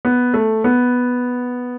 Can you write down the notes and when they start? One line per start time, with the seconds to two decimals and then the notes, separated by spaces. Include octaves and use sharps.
0.05 B3
0.34 A3
0.64 B3